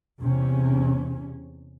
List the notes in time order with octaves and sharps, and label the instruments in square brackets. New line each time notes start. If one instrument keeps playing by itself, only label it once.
[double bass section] E2 C3 C#4